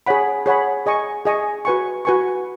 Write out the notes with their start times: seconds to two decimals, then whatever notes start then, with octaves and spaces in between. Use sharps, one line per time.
0.06 G#4 C#5 F#5 B5
0.46 G#4 C#5 F#5 B5
0.86 G#4 D#5 G#5 C#6
1.25 G#4 D#5 G#5 C#6
1.65 F#4 B4 G#5 C#6
2.05 F#4 B4 G#5 C#6